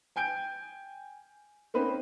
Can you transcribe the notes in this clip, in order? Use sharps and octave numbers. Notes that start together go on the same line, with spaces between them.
G5 G#5 G6 D7
A#3 C4 C#4 D#4 B4 C5